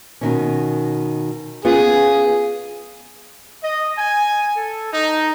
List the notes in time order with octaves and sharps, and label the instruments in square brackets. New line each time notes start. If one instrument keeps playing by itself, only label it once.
[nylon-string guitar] B2 D#3 C#4
[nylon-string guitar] B3 C#4 F4 [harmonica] G#4
[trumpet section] D#5
G#5
A4
D#4